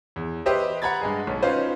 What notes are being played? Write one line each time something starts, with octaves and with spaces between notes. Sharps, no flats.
E2
G4 B4 C5 D#5 E5
F#5 A#5 B5 G#6 A6
G2 G#3 G#4
B1
C#4 D#4 F4 B4 C5